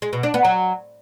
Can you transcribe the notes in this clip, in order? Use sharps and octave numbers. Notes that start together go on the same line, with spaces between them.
G#3
B2
D4
B3
F#3